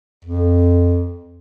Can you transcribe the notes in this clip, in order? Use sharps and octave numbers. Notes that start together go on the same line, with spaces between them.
F2